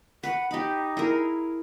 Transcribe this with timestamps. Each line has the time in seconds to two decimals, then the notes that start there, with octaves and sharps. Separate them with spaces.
0.24 B4 F#5 B5
0.51 D#4 G4 B5
0.97 E4 G#4 A#4